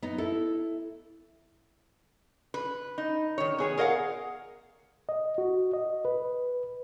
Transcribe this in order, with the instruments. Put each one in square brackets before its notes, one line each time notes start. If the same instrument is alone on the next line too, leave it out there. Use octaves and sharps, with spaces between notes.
[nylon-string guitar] B3 D#4
E4 A4
[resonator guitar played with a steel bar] B4
D#4
D#3 C#5
B3 G#4 C#5
G#4 A#4 D#5 F5 F#5
[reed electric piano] D#5
F#4
D#5
B4